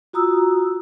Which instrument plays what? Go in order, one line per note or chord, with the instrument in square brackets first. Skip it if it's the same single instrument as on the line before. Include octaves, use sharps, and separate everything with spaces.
[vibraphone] F4 F#4 A#5 D#6 E6